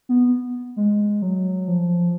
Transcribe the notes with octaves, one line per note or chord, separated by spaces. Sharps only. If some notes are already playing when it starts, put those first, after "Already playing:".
B3
G#3
F#3
F3